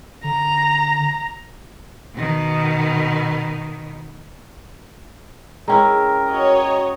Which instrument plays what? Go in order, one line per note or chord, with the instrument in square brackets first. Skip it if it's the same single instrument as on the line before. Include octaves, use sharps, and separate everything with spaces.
[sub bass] D3 [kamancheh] A#5
[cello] B2 D#3
[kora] G#3 C#4 E4 [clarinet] A#4 [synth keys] G5 A#5
[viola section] F#4 C#5 D#5